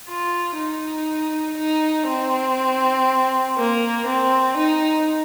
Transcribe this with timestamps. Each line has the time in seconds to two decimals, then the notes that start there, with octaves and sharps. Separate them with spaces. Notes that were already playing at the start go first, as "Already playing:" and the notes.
0.08 F4
0.58 D#4
1.58 D#4
2.07 C4
3.57 A#3
4.06 C4
4.57 D#4